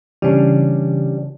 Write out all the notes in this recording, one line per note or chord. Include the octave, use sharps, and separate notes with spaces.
C#3 E3 G3 C#4 D4